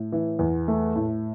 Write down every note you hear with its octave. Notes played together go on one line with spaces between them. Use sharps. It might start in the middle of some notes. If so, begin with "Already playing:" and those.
Already playing: A2
E3
E2
A3
A2